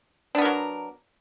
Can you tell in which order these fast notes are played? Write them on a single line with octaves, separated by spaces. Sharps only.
D4 B3 A#4 F#3